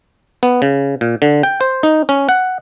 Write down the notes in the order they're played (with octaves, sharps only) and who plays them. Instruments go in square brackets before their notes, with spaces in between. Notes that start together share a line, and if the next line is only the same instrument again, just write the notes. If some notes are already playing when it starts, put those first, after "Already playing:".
[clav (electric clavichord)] B3
C#3
A#2
D3
G5
C5
D#4
C#4
F#5